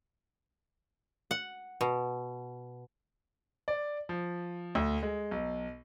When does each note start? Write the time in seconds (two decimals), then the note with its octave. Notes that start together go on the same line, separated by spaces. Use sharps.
1.31 F#5
1.81 B2
3.68 D5
4.09 F3
4.75 D2
5.03 G#3
5.31 B1